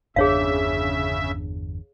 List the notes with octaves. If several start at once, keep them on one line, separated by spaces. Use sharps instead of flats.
G1 E2 C#3 D4 G#4 C#5 E5 F5